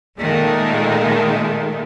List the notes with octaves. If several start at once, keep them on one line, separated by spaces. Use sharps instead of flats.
A#2 D#3 G#3 A3